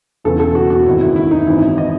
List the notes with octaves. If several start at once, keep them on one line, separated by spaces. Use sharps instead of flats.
E1 E2 C#3 E3 A4
A4
F#4
F#4
G#1 F#2 D#3 E4
E4
E4
D#4
G#1 F#2 C#3 E3 E4
D#5